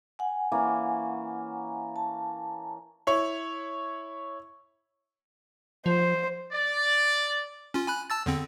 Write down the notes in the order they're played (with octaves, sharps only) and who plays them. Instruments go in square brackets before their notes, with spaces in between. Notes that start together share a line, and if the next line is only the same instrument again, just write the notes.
[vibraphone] F#5 G#5
[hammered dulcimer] E3 A#3 C#4
[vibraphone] A5
[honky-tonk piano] E4 C#5
[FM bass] F3 [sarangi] C5
[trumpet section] D5
[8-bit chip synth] C#4 F4
G#5 B5 F#6
A5 E6 A6
E2 D3 C4